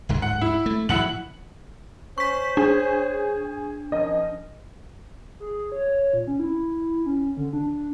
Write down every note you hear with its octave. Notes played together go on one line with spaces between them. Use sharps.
D1 G#2 D3
F#5
E4
A3
A2 E3 F#3 E4 F#5 F#7
C#4 C5 C#6 B6
D4 G#4
D#3 F3 C#4 D#5
G#4
C#5
A#2
C#4
E4
C#4
D3
D4